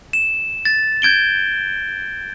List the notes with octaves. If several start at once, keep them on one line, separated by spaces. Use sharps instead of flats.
E7
A6
G6 G#6 D7 G7